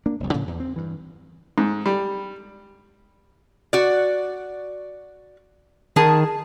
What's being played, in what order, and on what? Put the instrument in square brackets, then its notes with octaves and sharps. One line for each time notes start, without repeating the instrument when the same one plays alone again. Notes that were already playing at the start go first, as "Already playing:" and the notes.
[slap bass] A#3 D4
F1 C2
A2 C#3 F3 A#3
E2
C4
G2 E3
[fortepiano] G#2
G3
[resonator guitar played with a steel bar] F#4 D5
[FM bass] D#3 [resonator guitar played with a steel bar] G#4 A5